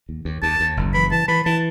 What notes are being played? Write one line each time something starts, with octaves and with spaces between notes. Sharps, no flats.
D#2
D#2
D#2 A5
D#2
F#1
E3 B5
E3 A5
E3 B5
E3 A5